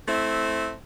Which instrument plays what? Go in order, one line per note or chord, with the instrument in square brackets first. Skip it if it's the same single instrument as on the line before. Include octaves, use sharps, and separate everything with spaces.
[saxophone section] A3 C4 E4